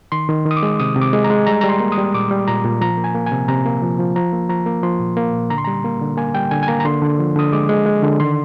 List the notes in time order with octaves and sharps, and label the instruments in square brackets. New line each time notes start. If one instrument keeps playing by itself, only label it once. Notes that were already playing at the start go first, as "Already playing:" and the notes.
[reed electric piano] D#3 C6
D#3
D#3
D#6
D6
G#3
C3 D#6
C3
D6
G#3
A#5
G#3
G3 A#5
G3 A#5
C6
A#3
D#6
G3
A#2 D6
G3
A#2 A#5
A#2
F3 A#5
A#3
G#5
A#3
G#5
C3
C3 A#5
A#3
F3
F3
F3 A#5
A#3
F3 A#5
A#3
F3 C6
A#2
A#3
A#2
D3 A#5
C6
G3 A#5
A#3
D3
A#3 G#5
G3 G5
D3 G#5
G#5
A#3 A#5
A#5
D3 C6
D3
F3
D3 D#6
G#3 D6
G#3
G#3
D3
D#3 C6